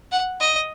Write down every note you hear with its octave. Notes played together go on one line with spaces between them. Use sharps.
F#5
D#5